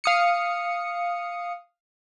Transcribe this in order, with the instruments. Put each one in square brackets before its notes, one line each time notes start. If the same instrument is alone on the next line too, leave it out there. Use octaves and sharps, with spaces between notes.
[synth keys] F5 D#6 C#7